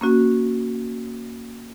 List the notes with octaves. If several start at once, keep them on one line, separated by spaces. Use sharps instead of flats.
A#3 C#4 F#4